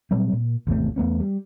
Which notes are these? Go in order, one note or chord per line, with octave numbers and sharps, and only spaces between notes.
A#2 F#3 G3 C4
A#2
G#1 E2 C3 A3
E2 A3 B3 C#4
G3